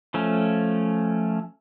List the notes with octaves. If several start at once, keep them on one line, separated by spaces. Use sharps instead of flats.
F3 A3 C#4